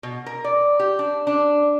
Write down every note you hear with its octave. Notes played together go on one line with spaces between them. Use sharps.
B2
A#4
D5
G4
D4
D4